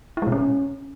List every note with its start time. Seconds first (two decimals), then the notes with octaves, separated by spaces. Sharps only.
0.17 E4
0.22 G#3
0.27 B2
0.32 C#4